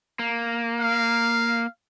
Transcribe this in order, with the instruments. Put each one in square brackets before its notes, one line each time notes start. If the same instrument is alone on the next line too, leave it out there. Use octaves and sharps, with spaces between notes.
[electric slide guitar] A#3
[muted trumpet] F5